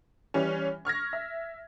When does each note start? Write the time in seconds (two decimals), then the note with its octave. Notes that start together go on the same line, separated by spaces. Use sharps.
0.34 E3 G3 C#4
0.85 C#6 F6 G#6 A#6
1.13 E5